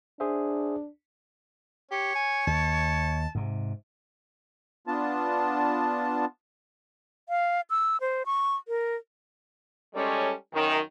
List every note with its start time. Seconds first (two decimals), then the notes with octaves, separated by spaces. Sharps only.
0.20 D4 G#4 C5 E5
1.91 G4 C#5
2.15 G#5
2.47 D#2 A5
3.35 G#2 C3
4.87 B3 D4 F4 A5
7.29 F5
7.70 E6
8.01 C5
8.26 C#6
8.68 A#4
9.95 G3 G#3 C#4 A4 C#5
10.54 F#2 D#3